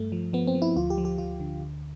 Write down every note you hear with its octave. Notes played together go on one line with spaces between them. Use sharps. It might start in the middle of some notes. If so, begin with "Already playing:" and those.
Already playing: G2 A3
F3
F3 B3
C4
F3
E4
D2 F4
G4
F3
G4
F3 F4
D3
D2